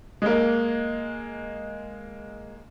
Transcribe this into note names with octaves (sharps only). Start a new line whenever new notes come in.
G#3 A#3